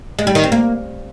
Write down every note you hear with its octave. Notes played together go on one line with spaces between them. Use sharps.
G#3
G3
D#3
C4
A#3